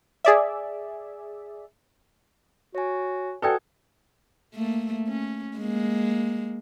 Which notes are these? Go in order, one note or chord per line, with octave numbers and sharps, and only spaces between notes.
G#4 D5 E5
F#4 C#5 G#5
F#4 A4 B4 D5 G5 G#5 D#6 G#6
A3 A#3
C#4
G#3 A#3